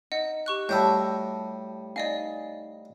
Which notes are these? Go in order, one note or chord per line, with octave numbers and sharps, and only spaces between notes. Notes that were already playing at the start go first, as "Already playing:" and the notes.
D#4 D#5 F#5
G4 C#6 F#6
A2 G3 F#4 A5 E6 G6
D#4 D5 D#5 F5 G#5